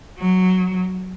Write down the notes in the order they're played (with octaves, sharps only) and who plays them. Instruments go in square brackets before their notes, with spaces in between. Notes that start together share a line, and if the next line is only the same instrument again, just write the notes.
[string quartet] F#3